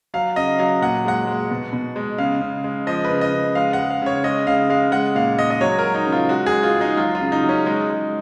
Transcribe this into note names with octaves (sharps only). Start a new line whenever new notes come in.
F#3 F5
C#3 D#5
F#3 F5
A#2 F#5
G#3 F#5
G#3
B2
B2
G#3
C#3 F5
C#3
G#3
F3 D#5
B4
C#3
D#5
C#3
G#3 F5
G#3 F#5
F5
C#3 C#5
G#3 D#5
C#3 F5
G#3 F5
G#3 F#5
A#2 F5
G#3 D#5
D#5
F#3 C#5
A#4
F#3
D#4
C#3
F4
G#3 F#4
G#4
G#3
F4
G#3
D#4
F#3 F4
F4
C#3
D#4
F#3
C#4
G#3 D#4
G#3